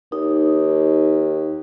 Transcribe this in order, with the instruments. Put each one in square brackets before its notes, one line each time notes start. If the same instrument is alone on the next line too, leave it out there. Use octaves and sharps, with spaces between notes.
[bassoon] D#2 [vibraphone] D#4